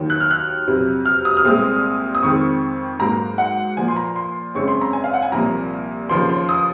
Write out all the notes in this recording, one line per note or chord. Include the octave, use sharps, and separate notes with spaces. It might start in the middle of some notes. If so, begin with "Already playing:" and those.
Already playing: D#2 D#3 F#3
F#6
F6
F#6
F2 C3 F#3
F6
D#6
F6
C2 A#2 G#3 C4 D#6
D#6
F2 D#3 G#3 C4 C#6
G#2 F#3 A#3 A#5
F#5
A#2 F3 A#3 G#5
C6
A#5
C6
F#2 C#3 G#3 C4 C#6
C6
A#5
G#5
F5
F#5
G#5
C2 A#2 F3 A#3 A#5
D#2 C#3 F3 A#3 C6
C6
D#6